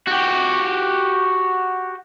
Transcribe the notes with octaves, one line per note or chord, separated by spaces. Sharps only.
F#4 G4